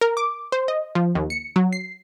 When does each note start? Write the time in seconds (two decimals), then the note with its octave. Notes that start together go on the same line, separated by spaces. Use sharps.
0.01 A#4
0.17 D6
0.52 C5
0.68 D#5
0.95 F3
1.15 D#2
1.30 C#7
1.56 F#3
1.73 C7